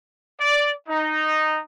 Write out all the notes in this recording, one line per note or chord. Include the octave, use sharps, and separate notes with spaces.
D5
D#4